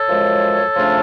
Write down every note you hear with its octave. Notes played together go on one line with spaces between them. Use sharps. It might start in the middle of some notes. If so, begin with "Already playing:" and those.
Already playing: A4 C#5
F#2 F3 G#3
C#3 F3 A3 D4 F4